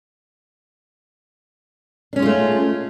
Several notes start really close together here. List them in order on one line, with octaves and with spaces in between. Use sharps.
D4 C#4 G#3 F4 A3